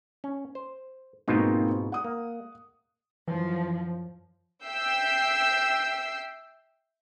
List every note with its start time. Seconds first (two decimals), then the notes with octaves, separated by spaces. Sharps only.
0.24 C#4
0.55 C5
1.28 G#2 B2 A#3 C4 D#4 F4
1.92 F#5 D#6
2.04 A#3
3.28 F#2 E3 F3
4.65 E5 G5 E6 G6 C7